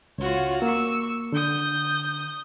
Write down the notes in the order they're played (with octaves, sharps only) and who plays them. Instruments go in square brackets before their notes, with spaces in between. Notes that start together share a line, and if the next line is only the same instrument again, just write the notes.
[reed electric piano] C#2 [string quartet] F4 F#4 C#5
[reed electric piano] A#3 [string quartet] C#6 E6
[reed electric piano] D3 [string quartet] D#6 G6